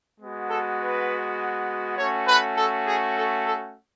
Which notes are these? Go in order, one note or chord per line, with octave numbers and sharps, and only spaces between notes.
G#3 B3 F#4
A4
B4
A3 C#4 F#4 C#5
B4
A4
G#4
A4
A4